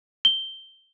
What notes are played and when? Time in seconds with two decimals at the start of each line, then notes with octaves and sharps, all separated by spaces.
0.25 G7